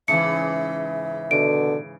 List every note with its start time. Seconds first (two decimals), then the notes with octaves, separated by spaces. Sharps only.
0.08 G#2 C#3 E3 E5 C#7
1.31 B2 D3 D7